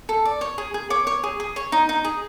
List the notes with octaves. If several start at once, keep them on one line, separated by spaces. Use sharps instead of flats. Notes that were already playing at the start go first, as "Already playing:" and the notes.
A4
D5
C#5
G#4
G#4
C#5 D6
C#5
G#4
G#4
C#5
D#4
D#4
G#4